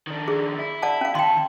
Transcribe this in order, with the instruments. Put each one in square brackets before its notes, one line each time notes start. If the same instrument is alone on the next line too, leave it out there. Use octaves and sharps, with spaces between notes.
[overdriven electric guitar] D#3 D4
[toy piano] G#4
[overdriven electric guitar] E4
[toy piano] D5 F#5 A5
C#4 F5
[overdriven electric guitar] D#3 A5 [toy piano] G5 C6